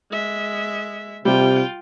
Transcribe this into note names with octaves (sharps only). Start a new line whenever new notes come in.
G#3 E5
C3 G3 F4 G5